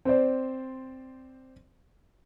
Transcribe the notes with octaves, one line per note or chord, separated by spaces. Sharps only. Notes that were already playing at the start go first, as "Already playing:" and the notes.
C4 C5 D5